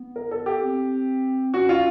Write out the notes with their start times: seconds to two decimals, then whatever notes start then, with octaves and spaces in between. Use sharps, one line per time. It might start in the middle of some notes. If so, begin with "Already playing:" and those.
Already playing: B3
0.16 A#4
0.31 A4
0.46 G4
0.62 C4
1.54 C#4 F#4
1.69 F4